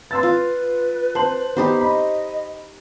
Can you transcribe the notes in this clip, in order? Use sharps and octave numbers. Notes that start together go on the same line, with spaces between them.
B4 C6 E6 A6
F4
C5 A5 C6 F#7
B3 D#4 G4 C5 B5
D#5 B5